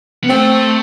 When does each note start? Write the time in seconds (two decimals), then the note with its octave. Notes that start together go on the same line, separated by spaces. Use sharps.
0.24 B3
0.29 A3 C4